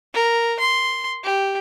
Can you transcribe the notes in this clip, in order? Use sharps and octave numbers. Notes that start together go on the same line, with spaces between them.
A#4
C6
G4